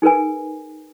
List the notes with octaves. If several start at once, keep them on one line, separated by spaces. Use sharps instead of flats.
D#4 G#4 A#4 B4 G#5